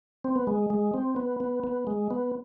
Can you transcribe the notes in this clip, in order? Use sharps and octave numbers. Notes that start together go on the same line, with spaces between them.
C4
B3
G#3
G#3
C4
B3
B3
B3
G#3
B3